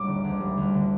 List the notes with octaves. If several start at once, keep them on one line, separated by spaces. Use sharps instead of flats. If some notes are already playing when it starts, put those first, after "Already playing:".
Already playing: G3 D6
D3
D2
G3
D2
D3